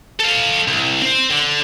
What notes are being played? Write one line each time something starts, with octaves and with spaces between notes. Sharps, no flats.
A4 F5
C2
C4 C5
D3